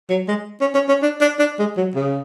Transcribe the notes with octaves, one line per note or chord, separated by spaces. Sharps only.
F#3
G#3
C#4
C#4
C#4
D4
D4
D4
G#3
F#3
C#3